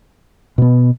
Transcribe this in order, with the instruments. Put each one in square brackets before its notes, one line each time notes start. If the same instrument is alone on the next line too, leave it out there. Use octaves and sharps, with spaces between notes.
[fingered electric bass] B2 B3